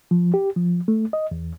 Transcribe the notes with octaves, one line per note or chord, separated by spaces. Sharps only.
F3
G4
F3
A3
D#5
E2